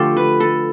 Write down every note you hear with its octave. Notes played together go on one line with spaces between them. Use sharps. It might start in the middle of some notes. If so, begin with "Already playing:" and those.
Already playing: D3 F3 A3 F4 G4 A4
B4
A4